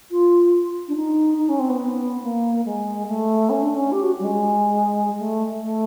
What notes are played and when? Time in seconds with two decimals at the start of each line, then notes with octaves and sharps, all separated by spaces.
0.11 F4
0.88 D4
0.96 D#4
1.38 D#4
1.49 C#4
1.59 C4
1.69 B3
2.23 A#3
2.65 G#3
3.08 A3
3.50 C#4
3.62 D4
3.75 C#4
3.92 G4
4.03 F#4
4.20 G3
4.24 G#3
5.19 A3
5.62 A3